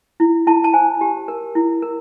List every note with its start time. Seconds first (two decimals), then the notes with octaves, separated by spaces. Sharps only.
0.20 E4
0.47 E4 A5
0.64 A5
0.74 C5 G#5
1.01 G4
1.28 A#4
1.55 E4
1.82 A#4